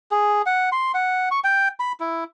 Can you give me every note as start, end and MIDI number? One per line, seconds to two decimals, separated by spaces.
0.11 0.42 68
0.46 0.69 78
0.72 0.92 84
0.94 1.29 78
1.31 1.39 85
1.44 1.68 79
1.80 1.92 83
2.00 2.24 64